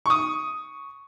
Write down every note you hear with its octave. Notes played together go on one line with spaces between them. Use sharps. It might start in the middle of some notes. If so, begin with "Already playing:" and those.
C#6 D#6